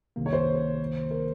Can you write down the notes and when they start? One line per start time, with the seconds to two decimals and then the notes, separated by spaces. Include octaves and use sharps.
0.16 C2 C3 D#3 A#3
0.26 C#5
0.33 C5
1.11 A#4